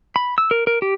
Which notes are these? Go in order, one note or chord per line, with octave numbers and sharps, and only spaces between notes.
B5
E6
A#4
A#4
G4